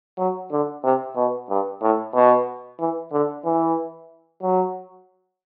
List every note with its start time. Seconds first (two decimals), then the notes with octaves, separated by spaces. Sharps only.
0.18 F#3
0.51 D3
0.84 C3
1.16 B2
1.50 G2
1.82 A2
2.14 B2
2.79 E3
3.12 D3
3.45 E3
4.43 F#3